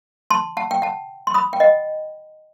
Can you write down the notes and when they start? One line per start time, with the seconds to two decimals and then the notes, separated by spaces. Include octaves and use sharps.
0.30 A5 C6
0.57 F#5 A5
0.71 G5
0.82 F#5 A5
1.27 C6
1.34 B5 D#6
1.53 G5
1.60 D#5 F#5